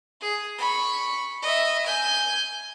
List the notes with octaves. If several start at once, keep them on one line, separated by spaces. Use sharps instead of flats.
G#4
B5 C#6
D#5 E5
G#5 G6